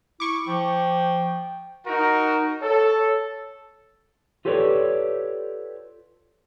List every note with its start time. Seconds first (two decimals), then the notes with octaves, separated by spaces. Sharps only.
0.20 E4 C#6 D6
0.48 F3 G5
1.86 D#4 F#4 A#4
2.62 A4 C#5
4.45 F4 G4 A4 B4 C#5 D5